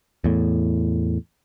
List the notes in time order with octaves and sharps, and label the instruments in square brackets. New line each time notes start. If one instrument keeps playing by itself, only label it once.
[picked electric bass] E2 A2